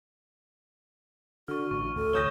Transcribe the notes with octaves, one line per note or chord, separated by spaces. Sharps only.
D3 F#4 C#6 F6
A1 C#6
D2 A4
C#5 D#6 G6 A#6 E7 G7